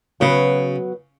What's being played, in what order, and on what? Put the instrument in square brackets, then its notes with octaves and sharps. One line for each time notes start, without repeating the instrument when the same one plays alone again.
[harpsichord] C#3 [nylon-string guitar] F#3 B3 F#4 B4